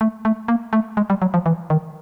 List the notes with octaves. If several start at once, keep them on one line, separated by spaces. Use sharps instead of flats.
A3
A3
A#3
A3
G#3
G3
F#3
F3
E3
D#3